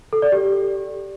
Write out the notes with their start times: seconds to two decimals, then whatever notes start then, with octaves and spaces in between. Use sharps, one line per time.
0.13 A4
0.22 D5
0.32 G4